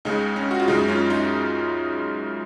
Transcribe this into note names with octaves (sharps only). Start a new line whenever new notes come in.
C#2 C#3 G#3 D#4
C#4
F#4
F4
F#2 C#3 G#3 D#4
C#4 F4
D#4